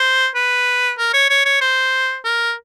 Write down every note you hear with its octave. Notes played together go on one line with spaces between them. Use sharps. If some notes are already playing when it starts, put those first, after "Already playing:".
Already playing: C5
B4
A#4
C#5
C#5
C#5
C5
A#4